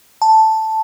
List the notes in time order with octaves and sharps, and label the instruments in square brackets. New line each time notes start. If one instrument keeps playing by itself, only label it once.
[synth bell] A5